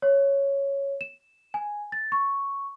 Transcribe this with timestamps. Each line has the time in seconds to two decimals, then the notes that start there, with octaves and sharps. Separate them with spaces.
0.02 C#5
1.01 E7
1.54 G#5
1.92 A6
2.12 C#6